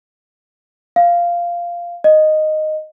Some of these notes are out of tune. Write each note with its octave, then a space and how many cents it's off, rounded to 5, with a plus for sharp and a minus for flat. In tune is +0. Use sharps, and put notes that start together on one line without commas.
F5 -10
D#5 -5